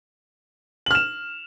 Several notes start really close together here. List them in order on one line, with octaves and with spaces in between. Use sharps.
F#7 F6 E7